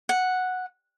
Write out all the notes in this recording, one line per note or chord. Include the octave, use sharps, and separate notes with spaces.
F#5